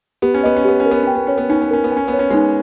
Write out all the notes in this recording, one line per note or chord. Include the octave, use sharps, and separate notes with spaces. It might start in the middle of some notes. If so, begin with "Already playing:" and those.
B3 G4
C#4
B3 D#5
C#4
B3 G4
C#4
A#4
B3
C#4 G5
B3
C#4 C#5
B3
C#4 D#4
B3
C#4 A#4
B3
C#4 G#5
B3
C#5
C#4
G#3 B3 D#4